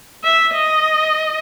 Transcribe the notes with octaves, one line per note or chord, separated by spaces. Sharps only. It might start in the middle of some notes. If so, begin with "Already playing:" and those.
E5
D#5